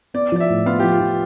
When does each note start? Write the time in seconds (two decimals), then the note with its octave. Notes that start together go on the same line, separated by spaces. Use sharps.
0.14 B3 D5
0.32 F3 D5
0.40 E5
0.49 A2
0.66 B3 F4
0.80 F3 G4
0.92 F4
1.01 F3